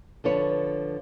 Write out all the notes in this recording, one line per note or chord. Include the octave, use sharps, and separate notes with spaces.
D3 F3 B4 C#5